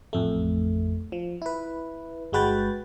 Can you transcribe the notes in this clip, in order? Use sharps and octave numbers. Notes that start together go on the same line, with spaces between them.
A1 F2 A3
F3
E4 B4
G1 G#3 F#4 B4 G5 A6